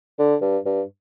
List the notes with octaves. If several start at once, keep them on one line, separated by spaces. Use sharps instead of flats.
D3
G2
G2